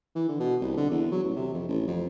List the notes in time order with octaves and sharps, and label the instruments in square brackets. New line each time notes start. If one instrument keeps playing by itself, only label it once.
[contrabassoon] E3
D3
B2
C2
D3
E2
F#3
A1
C3
F2
A1
F2